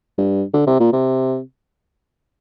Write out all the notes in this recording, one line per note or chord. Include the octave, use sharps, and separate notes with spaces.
G2
D3
C3
A#2
C3